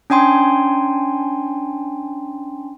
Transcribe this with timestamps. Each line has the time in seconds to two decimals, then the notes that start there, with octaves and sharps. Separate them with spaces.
0.10 C#4 D4 G5 G#5 C6